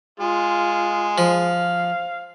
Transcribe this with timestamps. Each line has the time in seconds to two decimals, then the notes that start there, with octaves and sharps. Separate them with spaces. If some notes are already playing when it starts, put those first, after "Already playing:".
0.20 G#3 F4
1.18 F3 F5